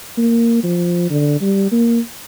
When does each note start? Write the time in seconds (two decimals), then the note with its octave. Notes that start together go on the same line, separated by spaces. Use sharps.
0.18 A#3
0.64 F3
1.11 D3
1.41 G3
1.72 A#3